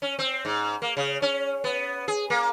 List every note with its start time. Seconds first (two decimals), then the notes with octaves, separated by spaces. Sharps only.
0.02 C#4
0.19 C4
0.45 G#2
0.82 A#3
0.97 C#3
1.22 C#4
1.64 B3
2.08 G#4
2.30 A#3